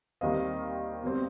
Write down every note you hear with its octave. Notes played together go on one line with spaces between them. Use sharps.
D#2 D#3 G3 C4 D#5 F5
B2 G3 C4